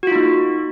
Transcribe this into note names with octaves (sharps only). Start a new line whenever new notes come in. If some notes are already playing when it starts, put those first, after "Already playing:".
A#3 D#4 F4 F#4